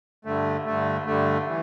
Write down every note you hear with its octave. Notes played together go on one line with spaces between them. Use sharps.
G2 D3 A3
G2 D3 A3
G2 D3 A3
E3